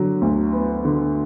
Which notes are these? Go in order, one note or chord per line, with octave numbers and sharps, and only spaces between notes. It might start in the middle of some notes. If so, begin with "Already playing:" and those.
Already playing: D3 F#3
D2
B3
D3